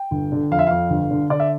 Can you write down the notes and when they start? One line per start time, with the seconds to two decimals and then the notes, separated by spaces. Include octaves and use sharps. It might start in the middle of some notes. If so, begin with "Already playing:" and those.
Already playing: G5
0.11 G1
0.32 D3
0.51 F2 F5
0.59 E5
0.67 F2 F5
0.90 G1
1.11 D3
1.30 D3 D5
1.40 E5